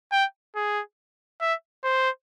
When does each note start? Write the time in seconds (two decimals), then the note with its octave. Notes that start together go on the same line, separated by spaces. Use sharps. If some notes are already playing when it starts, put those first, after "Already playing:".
0.12 G5
0.56 G#4
1.41 E5
1.84 C5